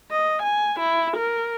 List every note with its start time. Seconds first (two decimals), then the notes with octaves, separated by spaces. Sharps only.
0.11 D#5
0.43 G#5
0.80 E4
1.17 A#4